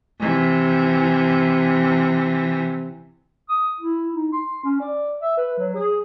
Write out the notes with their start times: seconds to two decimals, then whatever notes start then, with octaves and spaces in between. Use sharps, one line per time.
0.20 C3 E3
3.49 D#6
3.80 E4
4.13 D#4
4.32 C6
4.64 C#4
4.80 D5
5.22 E5
5.37 B4
5.58 F#3
5.75 G#4